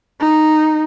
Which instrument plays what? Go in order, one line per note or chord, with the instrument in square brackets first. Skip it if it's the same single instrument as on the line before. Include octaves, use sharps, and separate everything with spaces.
[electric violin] D#4